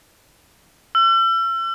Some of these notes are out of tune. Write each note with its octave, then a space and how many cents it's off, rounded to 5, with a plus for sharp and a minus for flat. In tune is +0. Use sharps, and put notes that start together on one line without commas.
E6 +40